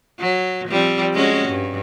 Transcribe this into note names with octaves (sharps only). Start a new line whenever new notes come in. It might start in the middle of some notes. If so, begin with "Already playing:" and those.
F#3
F3 G3 C4
G#3 C#4 F#4
G2